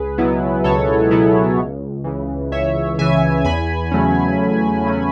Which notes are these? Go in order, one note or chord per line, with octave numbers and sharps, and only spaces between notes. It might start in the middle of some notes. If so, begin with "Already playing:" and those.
Already playing: C#2 G#4 B4
B2 F#3 B3 E4
C#2 A4 C#5
B2 F#3 B3 E4
C#2
C#3 E3
C#2 C#5 E5
C#3 E3 E5 G#5
E2 G#5 B5
C#3 F#3 A3 C#4
E2
C#3 F#3 A3 C#4